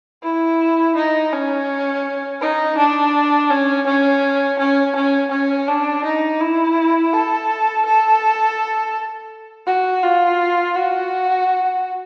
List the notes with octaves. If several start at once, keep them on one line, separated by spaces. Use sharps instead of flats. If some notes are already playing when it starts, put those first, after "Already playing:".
E4
D#4
C#4
D#4
D4
C#4
C#4
C#4
C#4
C#4
D4
D#4
E4
A4
A4
F#4
F4
F#4